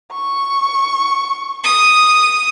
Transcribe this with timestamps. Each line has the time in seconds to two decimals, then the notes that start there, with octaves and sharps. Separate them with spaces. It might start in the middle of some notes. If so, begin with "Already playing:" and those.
0.12 C#6
1.64 D#6